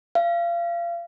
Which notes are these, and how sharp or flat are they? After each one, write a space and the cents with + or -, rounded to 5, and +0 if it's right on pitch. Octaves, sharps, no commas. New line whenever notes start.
F5 -30